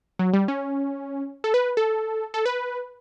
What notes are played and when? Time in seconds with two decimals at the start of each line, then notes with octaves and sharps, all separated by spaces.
0.19 F#3
0.33 G3
0.48 C#4
1.44 A4
1.54 B4
1.77 A4
2.34 A4
2.46 B4